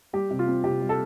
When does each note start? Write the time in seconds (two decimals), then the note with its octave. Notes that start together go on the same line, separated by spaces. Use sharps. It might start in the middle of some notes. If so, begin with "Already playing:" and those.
0.13 G3 G4
0.31 C3
0.39 F4
0.48 C4
0.64 C3 G4
0.81 G3
0.89 A4